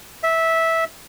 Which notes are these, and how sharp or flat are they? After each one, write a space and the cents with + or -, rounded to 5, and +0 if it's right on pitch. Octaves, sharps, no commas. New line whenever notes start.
E5 -10